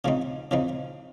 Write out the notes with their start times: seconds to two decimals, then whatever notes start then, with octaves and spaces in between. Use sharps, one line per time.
0.05 C#3 F3 C4 D#4
0.51 C#3 F3 C4 D#4